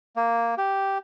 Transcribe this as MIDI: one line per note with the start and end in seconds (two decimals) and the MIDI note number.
0.16 0.55 58
0.58 0.98 67